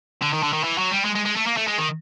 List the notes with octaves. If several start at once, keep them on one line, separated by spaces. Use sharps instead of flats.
D3
D#3
D3
D#3
E3
F#3
G3
G#3
G#3
G#3
A3
A#3
A3
G#3
D#3